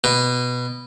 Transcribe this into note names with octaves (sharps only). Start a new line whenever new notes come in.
B2